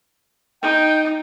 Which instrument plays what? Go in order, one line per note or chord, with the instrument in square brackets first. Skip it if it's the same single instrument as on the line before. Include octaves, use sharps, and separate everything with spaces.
[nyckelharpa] D#4 [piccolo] G5